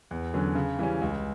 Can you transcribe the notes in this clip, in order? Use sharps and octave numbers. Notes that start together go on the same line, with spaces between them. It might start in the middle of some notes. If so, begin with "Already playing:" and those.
E2
D3 F#3 C#4
C#3
E3 G3 C#4
C#2